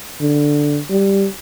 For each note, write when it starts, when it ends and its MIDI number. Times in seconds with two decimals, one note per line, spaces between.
0.21 0.80 50
0.90 1.27 55